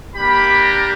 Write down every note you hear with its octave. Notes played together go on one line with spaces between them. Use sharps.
A#3 D4 G4 B5
A#5